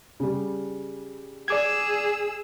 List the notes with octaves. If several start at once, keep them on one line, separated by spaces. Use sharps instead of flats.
C#3 G3
G#4 D5 D6 E6 G#6